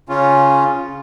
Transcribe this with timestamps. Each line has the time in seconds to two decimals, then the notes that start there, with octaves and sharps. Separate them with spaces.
0.09 C#3 C#4 F4